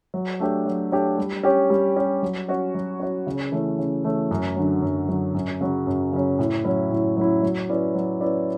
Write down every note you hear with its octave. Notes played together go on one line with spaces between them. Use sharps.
F#3
A3 D4 G4 C#5
F#3
A3 D4 G4 C#5
G3
C#4 G4 C#5
G3
C#4 G4 C#5
F#3
C#4 F#4 C#5
F#3
C#4 F#4 C#5
C#3
E3 A3 C#4
C#3
E3 A3 C#4
F#2
D3 F#3
F#2
D3 F#3
F#2
C#3 F#3 C#4
F#2
C#3 F#3 C#4
A2
F#3 C#4 E4
A2
F#3 C#4 E4
F#3
C#4 E4 B4 D5
F#3
C#4 E4 B4 D5